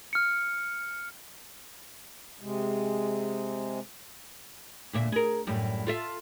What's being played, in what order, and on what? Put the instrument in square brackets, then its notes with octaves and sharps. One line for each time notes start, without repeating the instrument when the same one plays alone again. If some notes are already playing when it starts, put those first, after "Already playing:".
[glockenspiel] F6 C#7
[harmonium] C3 G#3
[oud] D2 A#2 E5
G#4 A#4
F#2 A2 G3
F4 A4 E5